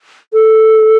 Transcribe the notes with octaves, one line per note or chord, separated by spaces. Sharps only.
A4